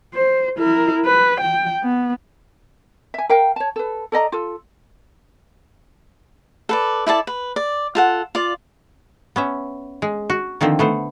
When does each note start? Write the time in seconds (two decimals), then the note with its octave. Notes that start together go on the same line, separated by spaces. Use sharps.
0.14 C5
0.59 E4 A#4
1.05 B4
1.40 G5
1.82 B3
3.14 E5 G#5
3.29 A#4 F5 G5
3.56 C#5 A5
3.76 A4 B4
4.12 A4 D5 D#5 A#5
4.32 F4 A4
6.69 A4 B4 D5
7.07 E4 A4 D5 A5
7.27 B4
7.56 D5
7.95 F4 A4 F#5
8.35 F4 D5
9.36 B3 C#4 E5
10.02 G#3
10.30 F#4
10.61 D3 D#3 F3 C4
10.79 A3 B3 C5